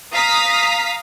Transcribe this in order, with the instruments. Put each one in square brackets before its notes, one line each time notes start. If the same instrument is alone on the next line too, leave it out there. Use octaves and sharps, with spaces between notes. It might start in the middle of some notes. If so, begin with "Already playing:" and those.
[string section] F5 A#5 D#6 B6